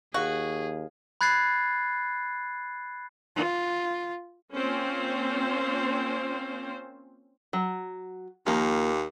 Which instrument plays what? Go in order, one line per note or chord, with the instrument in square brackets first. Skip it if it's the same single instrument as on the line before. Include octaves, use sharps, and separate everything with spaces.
[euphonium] D#2 [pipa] F#4 [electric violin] G#4 [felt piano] F5
[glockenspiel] B5 F#6 G#6 A6 C7
[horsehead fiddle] F4
[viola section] A#3 C4 C#4 F4 C5
[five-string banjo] F#3
[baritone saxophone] D#2 [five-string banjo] F3 A#3